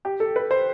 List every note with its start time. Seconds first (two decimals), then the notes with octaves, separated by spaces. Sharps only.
0.05 G4
0.20 A4
0.36 B4
0.51 C5